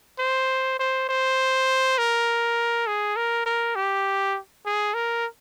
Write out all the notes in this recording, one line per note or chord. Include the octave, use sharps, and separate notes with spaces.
C5
C5
C5
A#4
G#4
A#4
A#4
G4
G#4
A#4